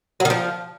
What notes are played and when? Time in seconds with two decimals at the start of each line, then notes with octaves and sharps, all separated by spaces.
0.20 F#3
0.25 D#3
0.30 F3